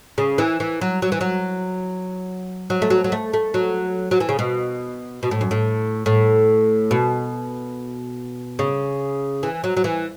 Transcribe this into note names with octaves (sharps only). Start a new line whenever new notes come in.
C#3
E3
E3
F#3
F#3
E3
F#3
F#3
A3
F#3
F#3
A3
A3
F#3
F#3
E3
C#3
B2
B2
A2
F#2
A2
A2
B2
C#3
E3
F#3
F#3
E3